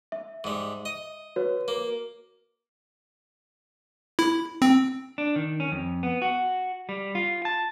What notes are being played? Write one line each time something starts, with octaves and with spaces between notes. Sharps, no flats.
E5
G#2 G3
D#5
F#4 B4 C#5
A#3
E4
C4
D4
D#3
C#4
F2
B3
F#4
G3
F4
A5